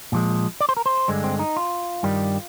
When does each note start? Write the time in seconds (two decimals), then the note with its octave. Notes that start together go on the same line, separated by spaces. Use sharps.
0.12 A#2 F3 G#3
0.60 D5
0.69 C5
0.77 A#4
0.86 C5
1.08 G2 D3 G#3
1.24 C4
1.39 D#4
1.56 F4
2.03 G2 D#3 G3